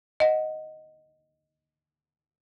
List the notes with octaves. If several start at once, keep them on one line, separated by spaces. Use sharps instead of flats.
D#5 F#5